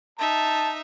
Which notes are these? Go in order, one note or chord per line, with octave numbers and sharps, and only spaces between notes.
D#4 E5 A5